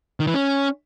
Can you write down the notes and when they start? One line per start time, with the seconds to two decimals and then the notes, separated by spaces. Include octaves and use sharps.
0.20 D#3
0.27 E3
0.34 C#4